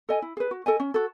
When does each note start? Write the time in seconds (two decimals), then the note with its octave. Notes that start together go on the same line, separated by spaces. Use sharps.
0.09 A4 D#5 G#5
0.22 E4
0.37 G#4 B4
0.51 F#4
0.66 A4 D#5 G#5
0.80 C#4
0.94 F#4 A4